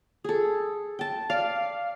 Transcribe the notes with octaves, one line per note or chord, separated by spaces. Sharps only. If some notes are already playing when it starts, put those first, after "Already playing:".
G#4 A4
G5 A5
D5 F5